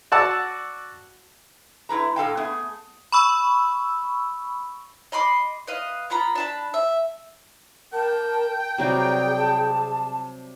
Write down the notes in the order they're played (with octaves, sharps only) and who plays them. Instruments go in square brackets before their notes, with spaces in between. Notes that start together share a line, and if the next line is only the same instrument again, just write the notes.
[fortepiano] F#4 D5 F#5 A5 E6
[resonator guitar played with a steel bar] A3 E4 B4 A#5
A2 A4 F5 G5
A3 B3 G#4
[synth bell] B5 C#6 E6
[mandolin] D#5 B5 C6 D6
B4 D#5 F5
B3 F4 A#5 B5
D4 A5 B5
E5
[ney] A#4 [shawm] G5 [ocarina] A5
[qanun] C3 F#3 G3 [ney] G#4 [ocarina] A#5
[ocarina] A5